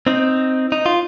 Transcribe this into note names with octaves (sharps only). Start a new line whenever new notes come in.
C4 D#4
D#4
F4